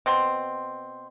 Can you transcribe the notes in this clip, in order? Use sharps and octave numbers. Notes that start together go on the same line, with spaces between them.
B2 C4 C6